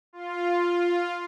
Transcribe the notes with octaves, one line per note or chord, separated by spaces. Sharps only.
F4